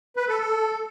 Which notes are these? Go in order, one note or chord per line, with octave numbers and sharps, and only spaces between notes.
B4
A4
A4